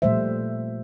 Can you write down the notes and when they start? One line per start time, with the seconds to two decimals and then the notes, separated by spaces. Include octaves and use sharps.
0.02 A#2 F3 G3 A3 C5 E5